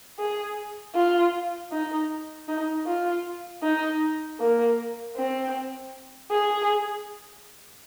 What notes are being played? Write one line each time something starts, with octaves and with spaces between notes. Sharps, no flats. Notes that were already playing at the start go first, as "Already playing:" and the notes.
G#4
F4
D#4
D#4
F4
D#4
A#3
C4
G#4